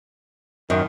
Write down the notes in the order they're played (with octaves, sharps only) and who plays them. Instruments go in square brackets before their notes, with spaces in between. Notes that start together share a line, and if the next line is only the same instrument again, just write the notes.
[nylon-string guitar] F#2 [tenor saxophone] D#3